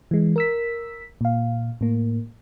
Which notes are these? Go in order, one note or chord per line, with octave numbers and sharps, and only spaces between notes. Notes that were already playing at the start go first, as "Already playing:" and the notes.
E3 G#3
A#4 E6 B6
A#2 F5
A2 A#3